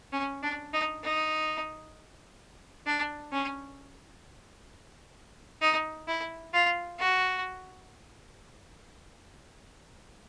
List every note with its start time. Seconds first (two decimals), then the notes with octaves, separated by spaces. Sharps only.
0.12 C#4
0.43 D4
0.73 D#4
1.04 D#4
2.87 D4
3.32 C#4
5.61 D#4
6.08 E4
6.54 F4
6.99 F#4